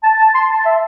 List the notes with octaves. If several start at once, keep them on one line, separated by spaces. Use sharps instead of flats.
A5
A5
C6
A5
E5